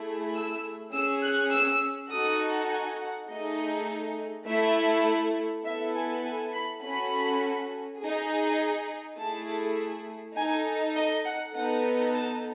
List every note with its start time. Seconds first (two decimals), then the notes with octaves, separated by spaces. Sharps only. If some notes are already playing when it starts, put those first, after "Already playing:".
Already playing: A3 E4 G#4
0.35 E6
0.93 C#4 G#4 E6
1.23 F#6
1.52 E6
2.11 D#4 F#4 A4 D#6
2.70 G#5
3.00 F#5
3.29 A3 D#4 G#4 D#5
4.47 A3 E4 A4 E5
5.65 B3 E4 A4 E5
5.94 G#5
6.25 G#5
6.53 B5
6.83 C#4 F#4 A4 B5
8.01 D#4 G#4
9.18 A3 E4 G#4 A5
10.37 D#4 A4 G#5
10.96 D#5
11.25 F#5
11.54 B3 D#4 A4 F#5
12.13 A5